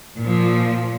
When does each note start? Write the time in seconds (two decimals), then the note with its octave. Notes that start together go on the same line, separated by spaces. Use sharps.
0.21 A#2 F3